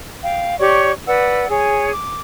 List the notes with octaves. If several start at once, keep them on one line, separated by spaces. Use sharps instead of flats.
F5 G5
G4 C#5 D5 C#6
B4 D5 F#5 E6
G#4 C#5 G#5
D6